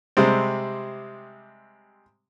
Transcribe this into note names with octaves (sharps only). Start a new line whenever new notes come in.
C3 G3 G#3 C4